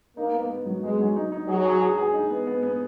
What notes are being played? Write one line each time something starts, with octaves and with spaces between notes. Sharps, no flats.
A#3 D#4
B3
B3
F#3
G#3 B3
F#3
D#4
D#4
F#3 G#4
G#4
G#4
G#4
D#4
B3
B3
B3